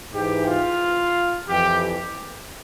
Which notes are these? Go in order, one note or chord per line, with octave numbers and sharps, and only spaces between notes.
G#2 E3 G4
F4
F2 E3 G4